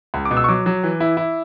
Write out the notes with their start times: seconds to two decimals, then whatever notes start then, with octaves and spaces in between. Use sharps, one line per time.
0.14 C#2
0.25 D6
0.31 B2
0.37 E6
0.44 C#6
0.48 F#3 D6
0.66 F#3
0.83 E3
1.00 E4
1.17 E4